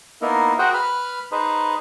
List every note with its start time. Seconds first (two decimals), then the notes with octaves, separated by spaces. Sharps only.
0.22 A#3 B3 D#4 E4 A#4
0.59 F#4 G#4 A#4 C5 F#5 G5
0.74 B4 B5 F6
1.32 D#4 G#4 B4 C5